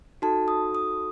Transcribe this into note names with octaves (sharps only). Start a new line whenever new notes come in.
D#4 F#4 A4 A5
D#6
D#6